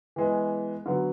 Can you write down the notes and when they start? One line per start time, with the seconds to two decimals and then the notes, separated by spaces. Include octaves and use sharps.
0.16 E3 G#3 B3
0.86 D3 F#3 B3